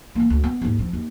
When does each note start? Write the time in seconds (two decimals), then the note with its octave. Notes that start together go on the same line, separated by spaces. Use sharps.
0.15 E3 A#3
0.30 D2
0.44 B3
0.61 D#2 G#2
0.79 F3 C4
0.93 D#2